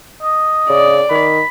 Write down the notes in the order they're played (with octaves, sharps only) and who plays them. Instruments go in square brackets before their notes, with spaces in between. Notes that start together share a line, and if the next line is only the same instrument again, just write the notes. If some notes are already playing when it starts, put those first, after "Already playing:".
[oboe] D#5
[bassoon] C#3 [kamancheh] D5
[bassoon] D#3 [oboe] B5